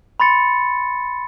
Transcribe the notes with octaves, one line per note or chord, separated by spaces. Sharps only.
B5 C6 A6 C#7